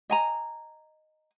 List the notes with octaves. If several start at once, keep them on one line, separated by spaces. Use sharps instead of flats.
D#5 G#5 A#5